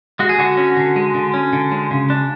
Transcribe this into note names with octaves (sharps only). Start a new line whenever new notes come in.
G#3 F#4
G#4
D3 F#4
C#4
D3
G#3
D3
C#4
D3
G#3
C#3
D4